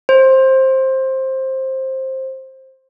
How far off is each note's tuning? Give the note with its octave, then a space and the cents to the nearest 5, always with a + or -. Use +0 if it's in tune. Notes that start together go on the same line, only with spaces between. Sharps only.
C5 +15